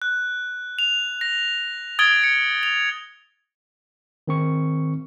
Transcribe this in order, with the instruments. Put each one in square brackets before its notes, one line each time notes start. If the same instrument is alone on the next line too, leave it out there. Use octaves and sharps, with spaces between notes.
[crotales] F#6
F7
A#6
D#6 G#6 A6 D7 G7
C#7
F7
[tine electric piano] D#3 C4 C#6